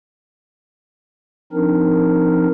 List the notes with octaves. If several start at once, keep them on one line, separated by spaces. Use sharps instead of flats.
F3 C4 D4 D#4 A#4